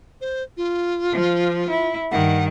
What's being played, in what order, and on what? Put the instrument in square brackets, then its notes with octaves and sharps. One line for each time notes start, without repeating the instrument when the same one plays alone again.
[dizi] C5
F4
[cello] F3
E4
[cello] G2 D#3 [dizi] F#5